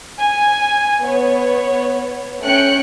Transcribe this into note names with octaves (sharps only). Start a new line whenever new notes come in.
G#5
B3 C#5
A3 C#4 G5 F#6 C#7